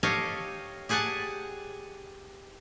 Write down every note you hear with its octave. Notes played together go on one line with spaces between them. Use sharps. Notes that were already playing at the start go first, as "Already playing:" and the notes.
G4 A4 C#5 D#5 F5
G4 G#4 F#5 G#5 A5